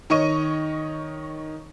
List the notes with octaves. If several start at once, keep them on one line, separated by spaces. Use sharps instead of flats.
D#3 C#5 D#5 C#6 D#7